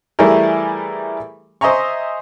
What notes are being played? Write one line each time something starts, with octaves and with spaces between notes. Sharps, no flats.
E3 G3 A3 E4 G#4 A#4
C5 D#5 E5 G#5 A#5 C#6